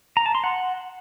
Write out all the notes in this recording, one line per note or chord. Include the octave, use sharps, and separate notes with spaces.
A#5
A5
C6
F#5